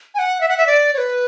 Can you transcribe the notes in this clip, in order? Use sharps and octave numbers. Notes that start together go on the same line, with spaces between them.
G#5
F#5
E5
F#5
E5
D5
C#5
B4